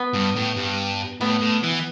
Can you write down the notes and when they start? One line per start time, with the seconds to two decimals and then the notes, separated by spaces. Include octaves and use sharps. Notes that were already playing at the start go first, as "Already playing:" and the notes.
Already playing: B3
0.14 G2
0.36 A2
0.57 G2
1.21 A2 B3
1.41 A2
1.64 E3